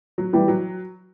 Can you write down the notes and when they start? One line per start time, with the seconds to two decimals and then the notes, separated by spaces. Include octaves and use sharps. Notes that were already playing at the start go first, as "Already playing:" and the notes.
0.18 F#3
0.33 E3 G3
0.48 F#3